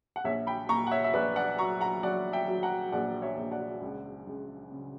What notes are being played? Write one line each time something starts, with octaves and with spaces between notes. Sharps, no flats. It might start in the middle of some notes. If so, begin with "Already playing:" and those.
F#5
A#1 C#5 E5
G5 B5
A#2 A#5 C#6
F#5
C#5 E5
E5
A#1 B4 D5
D5 F#5
F#3 A#5 C#6
F#5 A#5
F#3 D5 F#5
E5 G5
F#3
F#5 A#5
A#1 D5 F#5
C#5 E5
A#1
D5 F#5
C#2
C#2
C#3